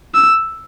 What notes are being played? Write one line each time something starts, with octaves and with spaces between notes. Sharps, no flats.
E6